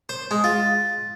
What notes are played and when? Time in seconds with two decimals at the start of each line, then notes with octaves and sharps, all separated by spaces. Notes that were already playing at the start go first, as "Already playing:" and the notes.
0.09 C5
0.31 G#3
0.44 F4